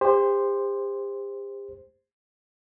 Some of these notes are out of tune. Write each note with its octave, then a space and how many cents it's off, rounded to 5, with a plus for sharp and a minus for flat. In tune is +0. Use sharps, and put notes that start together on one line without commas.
G4 +40 C5 +0 C6 +0